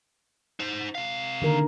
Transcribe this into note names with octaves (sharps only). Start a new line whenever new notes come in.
D#4 C5
C3 F5
D3 D#3 A#4